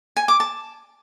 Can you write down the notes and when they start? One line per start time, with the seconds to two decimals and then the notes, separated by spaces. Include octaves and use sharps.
0.17 G#5
0.28 D6
0.40 A5